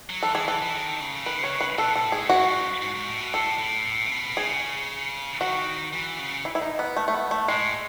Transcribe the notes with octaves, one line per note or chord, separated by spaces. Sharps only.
F#3
E3 A4
E3 G#4
E3 A4
E3
D#3
C#3
D#3 B4
C#3
C#5
C#3
B4
B2 A4
A4
A2
G#4
F#2 F#4
G#2
F#2
G#2
G#2
A2
B2
A2 A4
A2
A2
C#3
B2
C#3 G#4
D#3 F#4
E3
C#3
E4
E4
D#4
B3
A3
A3
B3
A3
A2 G#3